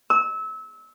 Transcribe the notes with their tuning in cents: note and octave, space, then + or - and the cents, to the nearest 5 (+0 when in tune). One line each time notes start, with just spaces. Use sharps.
E6 -25